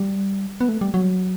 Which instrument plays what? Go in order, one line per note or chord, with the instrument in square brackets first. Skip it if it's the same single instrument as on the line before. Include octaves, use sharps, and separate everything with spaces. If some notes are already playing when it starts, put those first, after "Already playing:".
Already playing: [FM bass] G3
B3
A3
G3
F#3